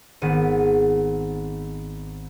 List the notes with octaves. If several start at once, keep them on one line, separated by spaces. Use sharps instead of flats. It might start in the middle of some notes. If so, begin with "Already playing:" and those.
G#1 B3 D#7